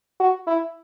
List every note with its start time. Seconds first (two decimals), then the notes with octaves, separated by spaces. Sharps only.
0.20 F#4
0.47 E4